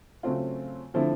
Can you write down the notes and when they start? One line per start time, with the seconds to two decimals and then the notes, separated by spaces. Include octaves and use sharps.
0.23 C#3 F#3 A3 C4 F4
0.94 D3 F3 A3 C4 E4